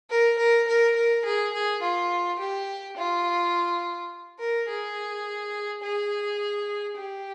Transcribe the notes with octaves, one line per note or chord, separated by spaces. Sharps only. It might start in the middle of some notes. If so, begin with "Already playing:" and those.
A#4
A#4
A#4
A#4
G#4
G#4
F4
G4
F4
A#4
G#4
G#4
G4